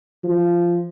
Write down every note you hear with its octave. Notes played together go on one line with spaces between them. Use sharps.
F3